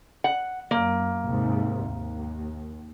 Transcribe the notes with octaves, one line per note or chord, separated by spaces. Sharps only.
F#5
F#2 A#3
D#2 G#2 C3
D#2